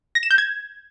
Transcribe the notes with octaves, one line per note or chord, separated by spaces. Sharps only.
A#6
E7
G6
G#6